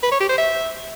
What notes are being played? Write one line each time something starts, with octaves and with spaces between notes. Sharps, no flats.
B4
C#5
G4
C5
E5